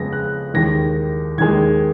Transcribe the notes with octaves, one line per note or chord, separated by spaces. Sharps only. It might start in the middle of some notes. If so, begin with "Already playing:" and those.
Already playing: F2 C#3 G#3 B3 A#6
F#6
D#2 D#3 G#3 A#6
D#2 D#3 G#3 G#6